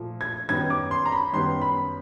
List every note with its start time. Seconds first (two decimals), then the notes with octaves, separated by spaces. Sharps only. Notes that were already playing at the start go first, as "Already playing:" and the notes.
Already playing: A#2 F3 A3
0.21 G#6
0.49 F#2 D#3 G3 B3 G#6
0.70 D6
0.91 C6
1.06 A#5
1.12 B5
1.33 F#2 D#3 G3 B3 C6
1.62 B5